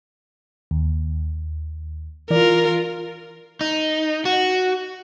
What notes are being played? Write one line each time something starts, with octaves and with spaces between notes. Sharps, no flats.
D#2
E3 F4 A#4 D5
D#4
F#4